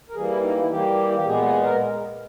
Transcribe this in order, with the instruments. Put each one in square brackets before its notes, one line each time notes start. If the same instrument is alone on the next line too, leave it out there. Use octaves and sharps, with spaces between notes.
[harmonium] A#4
E3 G3 A#3 G#4
E4
D#4
E4
E3 G3 A#3 G4
G4
A#2 G#3 B3 G#4
G#4
A#4